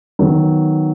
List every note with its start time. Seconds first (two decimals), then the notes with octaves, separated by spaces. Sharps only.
0.19 D#3 F#3 B3 F#4